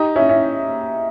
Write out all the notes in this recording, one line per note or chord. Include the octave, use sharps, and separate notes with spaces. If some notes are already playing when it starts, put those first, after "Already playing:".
Already playing: D#4 G4
C#4 E4
C#4 E4